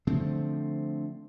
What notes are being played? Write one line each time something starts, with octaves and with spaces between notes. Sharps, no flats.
D3 F3 A3 C4